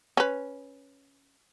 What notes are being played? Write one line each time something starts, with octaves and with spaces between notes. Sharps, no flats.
C#4 B4